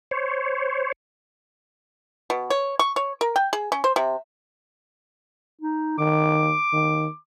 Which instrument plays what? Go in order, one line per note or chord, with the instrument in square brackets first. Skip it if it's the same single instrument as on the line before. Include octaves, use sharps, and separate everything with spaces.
[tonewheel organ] C5 C#5
[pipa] B2
C#5
C#6
C#5
A#4
G5
G#4
C#4
C5
C3
[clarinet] D#4
[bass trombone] D#3 [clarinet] D6
[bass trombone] D#3